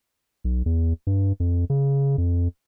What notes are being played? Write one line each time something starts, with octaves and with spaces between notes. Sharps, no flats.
B1
E2
G2
F2
C#3
F2